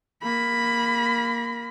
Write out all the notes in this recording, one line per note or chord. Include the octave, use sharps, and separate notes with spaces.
A#3 B5